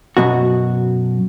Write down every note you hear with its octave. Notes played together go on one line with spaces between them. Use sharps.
F#2 B2 F#4